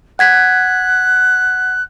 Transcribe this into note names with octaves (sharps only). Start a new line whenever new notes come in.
F#5 F#6 G#6 B6